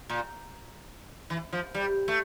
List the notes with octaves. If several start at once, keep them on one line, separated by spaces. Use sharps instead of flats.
A#2
E3
F3
G3
A3